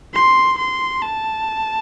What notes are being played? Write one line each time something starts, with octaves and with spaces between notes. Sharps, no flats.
C6
C6
A5